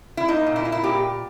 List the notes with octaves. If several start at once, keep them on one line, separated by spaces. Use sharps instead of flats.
E4
A#3 D#4
A#2
E4
A#3
E4
A#2 G4